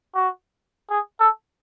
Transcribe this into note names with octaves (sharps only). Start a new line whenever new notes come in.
F#4
G#4
A4